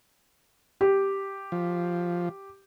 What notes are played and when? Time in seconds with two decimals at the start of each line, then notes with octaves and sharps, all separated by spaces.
0.81 G4
1.52 F3